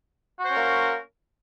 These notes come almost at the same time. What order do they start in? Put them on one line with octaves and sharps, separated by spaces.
F#4 C5 C#4 A#4 A#3